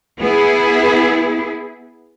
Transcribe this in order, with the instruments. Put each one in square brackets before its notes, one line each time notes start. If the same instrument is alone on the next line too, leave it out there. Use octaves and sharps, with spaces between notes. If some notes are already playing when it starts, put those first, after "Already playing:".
[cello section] B3 E4 G#4